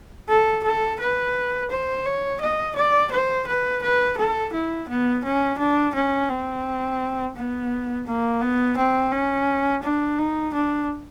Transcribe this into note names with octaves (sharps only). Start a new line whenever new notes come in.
A4
A4
B4
C5
C#5
D#5
D5
C5
B4
B4
A4
E4
B3
C#4
D4
C#4
C4
B3
A#3
B3
C4
C#4
D4
D#4
D4